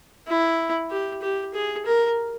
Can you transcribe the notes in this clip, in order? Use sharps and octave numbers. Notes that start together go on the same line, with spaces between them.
E4
G4
G4
G#4
A#4